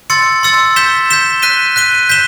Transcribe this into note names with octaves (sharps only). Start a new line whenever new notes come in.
C6 E6 A6 C#7
C6 E6 A6 C#7
G6 B6 E7 G7
G6 B6 E7 G7
F#6 B6 D#7 G7
F#6 B6 D#7 G7
G6 B6 E7 G7